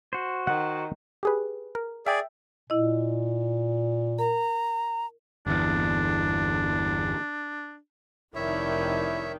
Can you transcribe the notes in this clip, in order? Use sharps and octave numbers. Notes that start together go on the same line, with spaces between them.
F#4 C5
D#3 F#5
G4 G#4 B4
A#4
G#4 D5 E5 G5
A#2 E4 D#5
A#4 A#5
G1 E2 D4
F1 D#3 D4 E4 C#5 E5